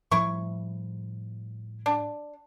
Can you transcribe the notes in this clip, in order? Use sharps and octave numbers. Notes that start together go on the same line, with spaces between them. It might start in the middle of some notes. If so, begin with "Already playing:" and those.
A2 F3 G3 E4 C#6
D4